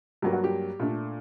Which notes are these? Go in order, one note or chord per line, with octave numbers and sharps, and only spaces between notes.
G2 F#3 A#3 G4
F#4
G4
A#2 A3 D4